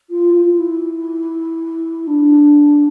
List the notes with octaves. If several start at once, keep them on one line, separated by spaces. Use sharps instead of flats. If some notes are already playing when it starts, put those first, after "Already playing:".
F4
F4
E4
D4